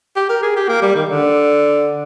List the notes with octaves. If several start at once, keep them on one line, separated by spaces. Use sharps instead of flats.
G4
A#4
G#4
G4
A#3
G3
D#3
D3